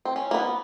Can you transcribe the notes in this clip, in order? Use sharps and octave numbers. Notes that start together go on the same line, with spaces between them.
C4
C#4
A#3
B3